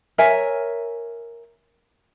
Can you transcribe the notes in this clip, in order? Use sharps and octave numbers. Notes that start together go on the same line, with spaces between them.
A#4 C#5 E5 G#5